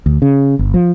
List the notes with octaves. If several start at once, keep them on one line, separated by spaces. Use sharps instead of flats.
D2
C#3
G1
F3